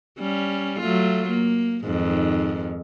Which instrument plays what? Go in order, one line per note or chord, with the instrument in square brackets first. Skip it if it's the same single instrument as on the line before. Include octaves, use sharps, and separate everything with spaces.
[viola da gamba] G3 C#4
F#3 A3 F4
A#3
F2 G#2 D#3